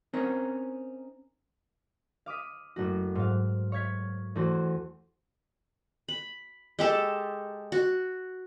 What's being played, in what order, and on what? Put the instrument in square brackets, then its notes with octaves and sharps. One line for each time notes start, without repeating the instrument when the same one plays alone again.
[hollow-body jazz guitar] C4 C#4 D#4 A#4
[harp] F5 D6 D#6 B6
F#1 A3 F#4
G#2 F#3 F5
C#5 F5 G#6 B6
E2 A3 F#4 C5
[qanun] B5
G#3 G4 A4
F#4